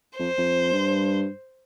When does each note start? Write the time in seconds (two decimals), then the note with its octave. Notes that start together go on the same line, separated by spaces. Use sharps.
0.18 F2 C5
0.38 F2
0.72 G2